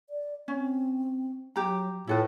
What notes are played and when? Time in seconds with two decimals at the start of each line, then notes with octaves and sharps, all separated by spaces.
0.10 D5
0.48 C4 C#4
1.56 F#3 G4 A#5
2.08 A2 E4 F4 A4 B4